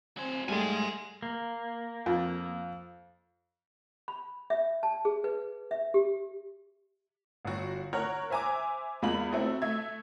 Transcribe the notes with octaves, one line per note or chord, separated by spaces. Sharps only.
F#3 C4 C5 G#5
G#2 G3 A3 G4 G#4 G#5 C6
A#3
F2
B5
E5
A5
G#4
B4
E5
G4
G1 F#3 F#4
A#4 C#5 F#5 F6 F#6
C5 E5 G#5 A#5 D6
E2 G#3 A#3 F4 B5 F#7
A3 C4 E4 F#4 A4
A3 E5 G#6